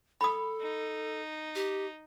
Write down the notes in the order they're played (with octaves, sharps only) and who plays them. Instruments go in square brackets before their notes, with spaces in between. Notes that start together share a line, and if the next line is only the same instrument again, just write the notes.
[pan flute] A4 [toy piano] B5 D#6
[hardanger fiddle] D#4
[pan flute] G4